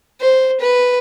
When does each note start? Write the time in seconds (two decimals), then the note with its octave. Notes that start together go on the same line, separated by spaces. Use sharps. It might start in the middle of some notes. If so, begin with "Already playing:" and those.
0.20 C5
0.60 B4